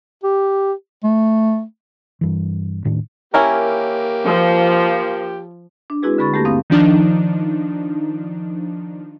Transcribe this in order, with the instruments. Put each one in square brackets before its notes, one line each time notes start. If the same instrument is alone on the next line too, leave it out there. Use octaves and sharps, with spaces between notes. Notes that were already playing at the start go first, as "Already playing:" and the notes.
[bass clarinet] G4
A3
[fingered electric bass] G2 E3
D#1 A2 D#3 D4
[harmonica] A#3 G4 [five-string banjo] C#4 E4 A#4
[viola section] F3
[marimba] D4
G#3 C4 E4 F#4 G#4 B4
D3 G#3 B5 C#6 A6
D#2 A3 A#3 G4 A4 A#6
G2 C4 F5 D#6
[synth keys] D#3 F3 D4 D#4